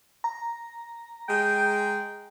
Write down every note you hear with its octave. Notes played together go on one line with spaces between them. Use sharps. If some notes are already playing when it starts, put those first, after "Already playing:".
A#5
G#3 G5